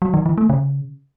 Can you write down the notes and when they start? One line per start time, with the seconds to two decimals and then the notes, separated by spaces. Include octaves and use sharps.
0.02 F#3
0.14 D#3
0.26 E3
0.38 A3
0.50 C#3